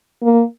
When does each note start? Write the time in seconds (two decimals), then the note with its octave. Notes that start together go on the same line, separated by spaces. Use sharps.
0.23 A#3